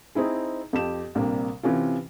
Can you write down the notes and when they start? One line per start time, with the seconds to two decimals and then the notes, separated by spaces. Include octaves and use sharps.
0.15 C4 D#4 E4 G#4
0.73 F2 G4 E7
1.15 A#1 C3 G3 A#3
1.63 C3 E3 C#4 F4